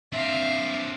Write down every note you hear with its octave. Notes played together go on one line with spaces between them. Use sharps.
C4 D4 E5 F5